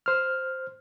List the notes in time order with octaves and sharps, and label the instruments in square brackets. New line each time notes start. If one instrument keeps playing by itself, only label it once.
[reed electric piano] C5 F6